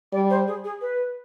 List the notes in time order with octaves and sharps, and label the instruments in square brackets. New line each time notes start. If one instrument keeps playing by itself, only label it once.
[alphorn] G3 [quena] D5
[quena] C5
G#4
G#4
B4